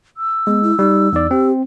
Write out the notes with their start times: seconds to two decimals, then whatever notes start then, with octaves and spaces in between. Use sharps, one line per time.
0.17 E6
0.47 G#3 B3
0.63 E4
0.79 G3 D#4
1.12 E2 D#4 D5
1.31 C4 G4